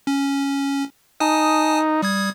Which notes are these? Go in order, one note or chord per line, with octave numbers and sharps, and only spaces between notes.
C#4
D#4 G#5 A5 D#6
G3 D#6 G#6